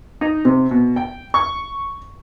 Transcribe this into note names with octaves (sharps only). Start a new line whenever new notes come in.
D#4
C3
B2
G5
C#6